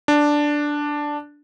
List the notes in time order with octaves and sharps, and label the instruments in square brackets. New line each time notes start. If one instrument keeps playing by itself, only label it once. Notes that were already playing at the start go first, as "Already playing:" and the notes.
[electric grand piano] D4